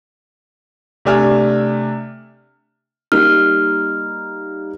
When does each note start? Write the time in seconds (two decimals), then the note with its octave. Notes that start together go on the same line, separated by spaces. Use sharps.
1.05 C3 A3 D4 G#5 F6
3.12 G3 A#3 D#4 F6